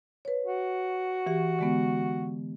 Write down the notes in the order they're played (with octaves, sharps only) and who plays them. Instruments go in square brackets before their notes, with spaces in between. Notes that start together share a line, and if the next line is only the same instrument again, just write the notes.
[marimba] B4 C#5
[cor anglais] F#4
[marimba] E3 G4
D3 G#3 B3